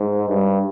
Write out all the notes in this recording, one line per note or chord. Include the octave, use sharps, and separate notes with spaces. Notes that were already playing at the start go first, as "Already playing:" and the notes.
Already playing: G#2
G2